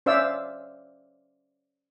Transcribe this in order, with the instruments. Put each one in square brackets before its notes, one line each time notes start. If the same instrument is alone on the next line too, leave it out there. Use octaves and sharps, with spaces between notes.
[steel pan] C#4 C5 D5 E5 F5 E6